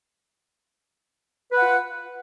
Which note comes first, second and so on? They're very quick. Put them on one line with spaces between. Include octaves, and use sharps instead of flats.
B4 F#5 F4